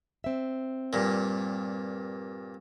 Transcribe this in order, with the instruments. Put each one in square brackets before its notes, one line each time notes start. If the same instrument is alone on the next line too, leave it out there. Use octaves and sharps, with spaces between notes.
[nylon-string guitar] C4 E5
[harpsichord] G2 A#2